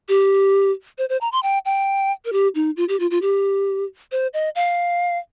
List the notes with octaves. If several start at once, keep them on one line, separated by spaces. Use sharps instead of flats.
G4
C5
C5
A#5
C6
G5
G5
A#4
G4
D#4
F4
G4
F4
F4
G4
C5
D#5
F5